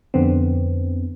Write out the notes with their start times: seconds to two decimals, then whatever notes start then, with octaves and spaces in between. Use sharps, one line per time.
0.14 F2 D3 B3 C4